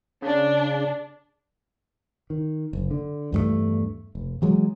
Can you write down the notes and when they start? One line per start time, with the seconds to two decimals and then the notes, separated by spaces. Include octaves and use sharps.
0.22 C#3 D4
2.30 D#3
2.73 F#1
2.91 D3
3.32 E2 G2 F#3 A3
4.15 F1
4.42 E3 F#3 G#3